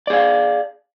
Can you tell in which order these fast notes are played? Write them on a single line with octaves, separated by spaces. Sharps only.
D5 G#4 F5